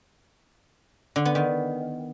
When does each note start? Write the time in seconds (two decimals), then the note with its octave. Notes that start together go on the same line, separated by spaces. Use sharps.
1.16 D3
1.25 B3
1.35 D#3